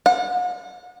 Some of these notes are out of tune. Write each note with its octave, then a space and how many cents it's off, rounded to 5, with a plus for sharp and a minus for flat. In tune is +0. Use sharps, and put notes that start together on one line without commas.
F#5 -35